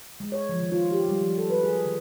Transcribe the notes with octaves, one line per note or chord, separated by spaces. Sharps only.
G#3
C#5
F3
D#3
F4
G4
G3
F3
A4
B4
G#4
D#3